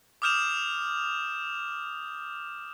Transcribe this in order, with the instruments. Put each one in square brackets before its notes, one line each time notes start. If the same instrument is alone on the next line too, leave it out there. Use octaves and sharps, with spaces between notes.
[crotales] D6 D#6 F6 G6 E7 F7